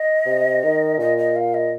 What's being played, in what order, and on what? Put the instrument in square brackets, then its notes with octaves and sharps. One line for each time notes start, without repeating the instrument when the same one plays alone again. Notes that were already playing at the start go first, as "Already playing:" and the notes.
Already playing: [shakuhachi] D#5
[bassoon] C3
D#3
[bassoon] A#2 [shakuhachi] D#5
[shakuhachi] D#5
F5
D#5